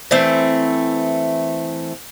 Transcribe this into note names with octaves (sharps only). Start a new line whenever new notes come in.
E3 A3 C4